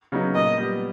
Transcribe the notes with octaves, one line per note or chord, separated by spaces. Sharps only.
C#3 F#3 B3 D#4
A#2 D#5
G3 B3